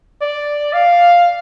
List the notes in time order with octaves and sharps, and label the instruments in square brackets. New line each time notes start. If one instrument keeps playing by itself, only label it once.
[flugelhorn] D5
F5